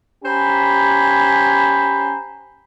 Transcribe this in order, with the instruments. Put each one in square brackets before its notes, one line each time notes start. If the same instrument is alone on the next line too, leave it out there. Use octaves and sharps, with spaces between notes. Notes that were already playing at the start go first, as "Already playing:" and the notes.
[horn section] C#4 G4 C5 G#5 A#5 B5